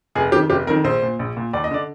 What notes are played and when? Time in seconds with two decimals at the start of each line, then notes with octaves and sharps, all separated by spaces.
0.15 F1 G#4
0.32 F2 D#3 G4
0.50 F1 G4
0.67 F2 A#4
0.70 D#3
0.84 A#1 C5
1.02 A#2
1.19 A#1
1.37 A#2
1.53 D#2 D5
1.64 D#5
1.71 D3 D5